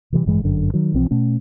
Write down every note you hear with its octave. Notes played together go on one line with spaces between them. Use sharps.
C3 E3 F3 G3
A1 G2 E3 G#3
G1 F#2 D3
D#3 F#3
B1 E3 F3 C4
B2 A3 C#4